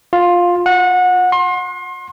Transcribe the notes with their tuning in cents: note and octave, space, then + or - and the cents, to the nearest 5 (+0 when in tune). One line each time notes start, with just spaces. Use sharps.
F4 +10
F#5 -25
C6 +35